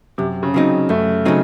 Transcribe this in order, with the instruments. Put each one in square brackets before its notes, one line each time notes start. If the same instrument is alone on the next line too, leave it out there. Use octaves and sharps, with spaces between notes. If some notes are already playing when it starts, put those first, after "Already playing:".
[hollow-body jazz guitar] F#2 [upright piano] C3
[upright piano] C#3
[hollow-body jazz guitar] C#3 F#3 C4 D#4
[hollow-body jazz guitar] F#2 [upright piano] A3
[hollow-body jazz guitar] C#3 F#3 C4 D#4